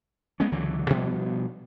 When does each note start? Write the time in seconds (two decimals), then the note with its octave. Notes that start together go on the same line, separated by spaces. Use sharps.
0.40 G#3 B3 C#4
0.52 C#2 D3 E3 F#3
0.90 B2 F3 G3 B3